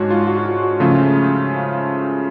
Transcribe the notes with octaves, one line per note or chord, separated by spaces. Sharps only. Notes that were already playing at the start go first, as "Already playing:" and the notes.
Already playing: G#2 G#3 D4 F#4 C#5
F4
F#4
F#4
F4
F#4
C#3 F3 A3 C#4 F4